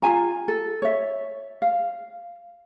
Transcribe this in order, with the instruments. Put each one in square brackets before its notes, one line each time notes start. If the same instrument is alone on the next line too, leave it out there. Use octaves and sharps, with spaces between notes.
[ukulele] F4 G4 G#5 A#5
A4
C#5 E5
F5